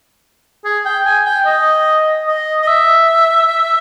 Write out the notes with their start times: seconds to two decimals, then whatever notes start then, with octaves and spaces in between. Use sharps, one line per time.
0.64 G#4
0.85 G5
1.05 G#5
1.25 G5
1.45 D#5
2.27 D#5
2.62 D#5
2.67 E5